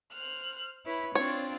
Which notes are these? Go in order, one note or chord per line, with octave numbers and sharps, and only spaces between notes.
C5 F6 F#6
E4 B4 C#5
C4 D4 F4 C#5